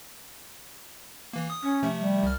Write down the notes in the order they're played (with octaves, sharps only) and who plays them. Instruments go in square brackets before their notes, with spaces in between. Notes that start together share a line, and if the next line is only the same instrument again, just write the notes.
[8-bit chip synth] E3 A#3
D#6
[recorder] C#4
[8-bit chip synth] C3 F3 A3
[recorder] G3
[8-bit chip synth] C2 F6